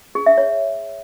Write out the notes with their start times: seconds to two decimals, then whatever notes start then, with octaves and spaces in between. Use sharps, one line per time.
0.15 G#4
0.26 E5
0.38 C#5